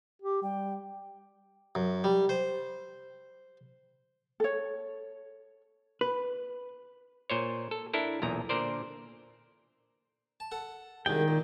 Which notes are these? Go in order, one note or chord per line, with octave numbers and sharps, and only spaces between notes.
G4
G3 G5
F#2
G3
C5
A4 C#5
B4
A#2 C5 C#5
A4
D4 E4 A4 A#4
B1 E2 A#2 A#5
A#2 D3 A#4 C5 D5
A5
A4 F#5
C2 F#2 D#3 G#3 G5
A#2